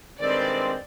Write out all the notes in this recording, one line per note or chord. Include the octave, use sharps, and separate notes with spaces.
G2 D#3 G#3 C4 D5